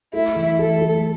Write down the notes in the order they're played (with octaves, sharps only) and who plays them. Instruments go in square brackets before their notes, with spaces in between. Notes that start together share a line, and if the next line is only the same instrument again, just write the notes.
[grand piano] A3 [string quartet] E4
[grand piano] E3
[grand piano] A3 [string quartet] A4
[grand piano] A3